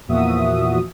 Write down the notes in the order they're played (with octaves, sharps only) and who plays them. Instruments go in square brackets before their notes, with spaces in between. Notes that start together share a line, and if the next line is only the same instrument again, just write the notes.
[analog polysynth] E2 A#2 F3 F#4 E5 D#6